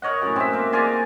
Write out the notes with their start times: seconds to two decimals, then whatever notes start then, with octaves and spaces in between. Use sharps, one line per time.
0.02 A#4 C#5 D#5 F#5
0.22 F#2 A2
0.36 C4 E5
0.53 A#3 A#4
0.73 F4 G#4 D5 A#5